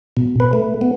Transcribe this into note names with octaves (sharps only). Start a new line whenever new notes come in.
B2
B4
A3
B3